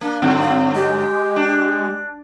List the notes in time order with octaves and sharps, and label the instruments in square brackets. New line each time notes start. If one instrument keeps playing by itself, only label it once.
[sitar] A#3 [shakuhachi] D4
[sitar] G2 D3 F#3 [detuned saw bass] C4
[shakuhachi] F5
[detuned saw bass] G#3 [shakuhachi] G4
[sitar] D4